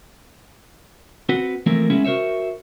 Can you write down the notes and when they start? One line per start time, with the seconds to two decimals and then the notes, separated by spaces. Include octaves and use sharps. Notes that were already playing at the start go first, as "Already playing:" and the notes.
1.29 C4 F#4 B4 F#5
1.66 E3 F3 A3 A#3 C4 A#4
1.90 C#3 G#3 B3 C#4 E4 G#4
2.04 F#4 A#4 C5 C#5 E5